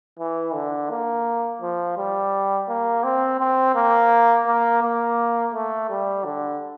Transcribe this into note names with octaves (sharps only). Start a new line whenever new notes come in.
E3
D3
A#3
F3
G3
A#3
C4
C4
A#3
A#3
A#3
A3
G3
D3